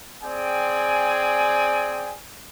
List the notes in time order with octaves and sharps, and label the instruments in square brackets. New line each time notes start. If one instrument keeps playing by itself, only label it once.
[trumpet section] C4 G#4 D5 G5 G#5